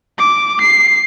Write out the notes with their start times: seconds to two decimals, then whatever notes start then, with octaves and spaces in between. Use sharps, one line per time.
0.19 D6
0.62 C7